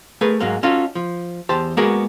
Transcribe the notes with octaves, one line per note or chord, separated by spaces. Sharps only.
A3 G#4 A#4 B4
G#2 F#3 G#3 A#3
C#4 D#4 F4 F#4 A4
F3
E2 G4 C5 A5
G#3 A#3 B3 F#4 G#4 A#4